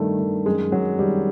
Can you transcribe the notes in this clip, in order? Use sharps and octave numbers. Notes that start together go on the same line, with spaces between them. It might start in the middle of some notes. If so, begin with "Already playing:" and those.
Already playing: G2 D#3 A3
D#3
F#2 G#3
F#2 F#3
D#3 G3